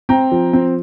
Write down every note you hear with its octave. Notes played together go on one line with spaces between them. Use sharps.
C4 G5 A#5
F3
C4